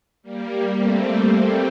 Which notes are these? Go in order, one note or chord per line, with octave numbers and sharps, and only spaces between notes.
G3 A#3
A3 C4